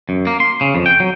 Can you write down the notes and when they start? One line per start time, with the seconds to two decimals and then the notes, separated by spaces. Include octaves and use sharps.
0.09 F#2
0.27 A#3
0.40 C6
0.61 C#3
0.75 F2
0.86 G5
1.00 F#3